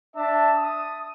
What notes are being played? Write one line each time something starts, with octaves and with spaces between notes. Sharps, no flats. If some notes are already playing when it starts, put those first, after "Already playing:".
D4 E5 A5
D#6